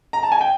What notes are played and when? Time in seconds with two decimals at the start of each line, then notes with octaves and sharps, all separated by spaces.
0.13 A#5
0.23 A5
0.32 G#5
0.41 G5